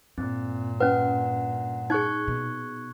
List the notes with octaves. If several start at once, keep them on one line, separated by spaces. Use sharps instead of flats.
G2 A#2 C4
C#4 B4 F#5
D#4 G#4 C#6 F#6 G#6
B2